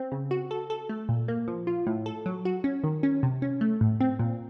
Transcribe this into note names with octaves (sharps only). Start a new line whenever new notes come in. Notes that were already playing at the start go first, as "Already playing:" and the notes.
Already playing: C4
C#3
F#4
A4
A4
A3
A#2
A#3
F3
F4
A2
A4
F#3
F#4
C#4
D#3
C#4
C3
C#4
A3
A2
C4
A#2